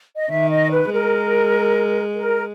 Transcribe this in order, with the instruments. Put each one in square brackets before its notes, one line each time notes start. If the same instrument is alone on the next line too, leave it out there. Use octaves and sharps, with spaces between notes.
[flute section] D#5
[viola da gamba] D#3 [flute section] E5
[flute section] D#5
B4
[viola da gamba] G#3 [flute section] A#4
[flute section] A#4